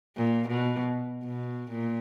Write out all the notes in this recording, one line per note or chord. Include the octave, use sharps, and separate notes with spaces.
A#2
B2
B2
A#2